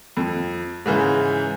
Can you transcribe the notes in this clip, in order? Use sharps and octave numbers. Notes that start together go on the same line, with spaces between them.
F2
G#2 C#3 E3